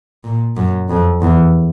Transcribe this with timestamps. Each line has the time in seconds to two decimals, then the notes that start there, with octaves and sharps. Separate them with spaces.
0.24 A#2
0.57 F#2
0.90 F2
1.22 E2